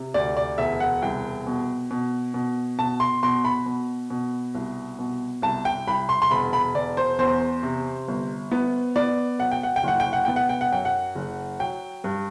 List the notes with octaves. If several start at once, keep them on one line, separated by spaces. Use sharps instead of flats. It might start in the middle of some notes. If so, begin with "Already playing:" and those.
Already playing: C3
D2 D5
D5
E1 E5
F#5
C2 G5
B2
B2
B2
B2 A5
C6
B2 C6
B5
B2
B2
C2
B2
C2 A5
G5
C2 B5
C6
C6
E1 B5
B5
E1 D5
C5
E2 C5
C3
G1
B3
B3 D5
F#3 F#5
G5
F#5
G5
F#1 F#5
G5
F#5
B3 G5
F#5
G5
F#5
F#2 G5
F#5
F#1
F#3 G5
G2